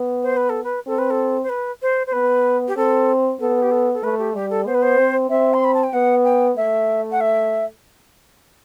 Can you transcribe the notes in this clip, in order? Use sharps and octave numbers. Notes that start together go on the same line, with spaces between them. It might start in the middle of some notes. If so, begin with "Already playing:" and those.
Already playing: B3
C5
B4
A4
B4
C4 A4
B4
A4
C5
B4
C5
C5
B3 B4
G4
C4 A4
B3 A4
G4
A4
A4
A3 B4
G4
G3 G4
A4
B3 C5
B4
C5
C4
C4 E5
C6
B5
A5
G5
B3 F#5
G5
A3 E5
F#5
E5